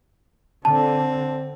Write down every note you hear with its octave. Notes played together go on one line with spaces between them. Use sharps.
D3 C4 A5